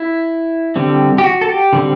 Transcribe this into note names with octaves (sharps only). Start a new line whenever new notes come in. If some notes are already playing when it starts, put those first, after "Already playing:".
Already playing: E4
D3 G3 C4
G4
F#4
A4
G4
D3 G3 C4